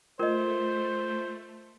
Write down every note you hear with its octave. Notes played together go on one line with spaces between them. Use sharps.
A3 F4 A#4 C5 D#5